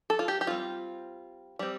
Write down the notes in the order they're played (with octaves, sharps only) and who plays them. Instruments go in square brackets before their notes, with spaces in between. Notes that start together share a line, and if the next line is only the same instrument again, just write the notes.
[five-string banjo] A4
F4
G4
G4
G3 C4 F4
G3 C4